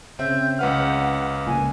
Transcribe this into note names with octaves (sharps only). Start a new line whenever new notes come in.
C#3 C4 E5 G6
C#2 B4 F#5 F6
C#2 A#2 G#5